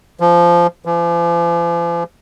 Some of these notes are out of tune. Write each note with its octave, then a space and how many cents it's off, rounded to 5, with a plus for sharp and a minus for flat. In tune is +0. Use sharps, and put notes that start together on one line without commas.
F3 -15
F3 -45